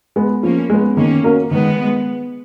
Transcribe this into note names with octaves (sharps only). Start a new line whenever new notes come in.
G#3 B3
F3 A#3 C#4
G#3 B3
D#3 A#3 C#4
A#3 C#4 F#4 A#4
D#3 G#3 B3